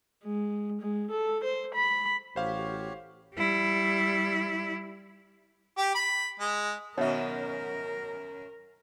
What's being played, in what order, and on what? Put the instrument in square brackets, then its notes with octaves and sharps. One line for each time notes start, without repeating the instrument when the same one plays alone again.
[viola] G#3
G#3
A4
C5
B5
[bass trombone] A1 [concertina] F#4 G4 C#5 [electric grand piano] C5 F5
[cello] G3 E4
[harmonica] G4
B5
G#3
[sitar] F#2 D#3 C#4 [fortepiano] B2 [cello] A#4 [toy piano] C#5 E5